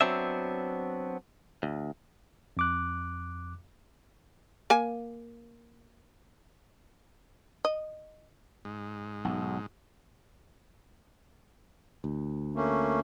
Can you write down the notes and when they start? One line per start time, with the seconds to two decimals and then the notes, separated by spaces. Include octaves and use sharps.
0.01 F#3 B3 C4 D4 E5
1.63 D2
2.57 F2 D6 F#6
4.70 A#3 G#5
7.65 D#5
8.65 G#2
9.25 B1
12.04 D2
12.55 A3 A#3 C#4